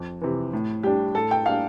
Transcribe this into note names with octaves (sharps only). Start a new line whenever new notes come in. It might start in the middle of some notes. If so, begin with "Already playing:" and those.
Already playing: F2
C3 E3
A2
G3 D4 G4
A2 A4
G5
G3 A#3 D4 F5